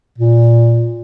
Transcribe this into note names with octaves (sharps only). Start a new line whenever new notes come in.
A#2